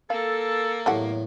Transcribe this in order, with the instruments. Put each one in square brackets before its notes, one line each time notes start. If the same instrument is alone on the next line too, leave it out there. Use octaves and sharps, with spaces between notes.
[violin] A#3 [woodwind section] A4 [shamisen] F5
[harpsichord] E2 A2 F#3 [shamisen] A3 G4 F#5